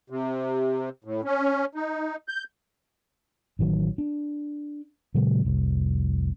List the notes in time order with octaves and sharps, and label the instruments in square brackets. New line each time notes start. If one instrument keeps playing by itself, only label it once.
[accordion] C3
A2
C#4
D#4
G6
[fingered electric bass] A1 D#3 F#3
D4
A#2 C#3 F#3 G#3
F1 C2